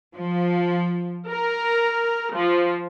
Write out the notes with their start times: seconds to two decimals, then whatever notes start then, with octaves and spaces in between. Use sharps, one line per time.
0.15 F3
1.26 A#4
2.31 F3